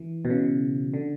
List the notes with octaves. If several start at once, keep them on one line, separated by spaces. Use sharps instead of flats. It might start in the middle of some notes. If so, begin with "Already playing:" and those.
Already playing: E3
B2
C#3
D3